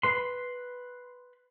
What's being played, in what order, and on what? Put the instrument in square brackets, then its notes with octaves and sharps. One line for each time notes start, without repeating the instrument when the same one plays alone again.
[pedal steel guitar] B4 C6